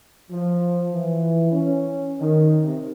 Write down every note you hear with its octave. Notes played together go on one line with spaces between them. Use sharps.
F3
E3
C#4
D#3
C3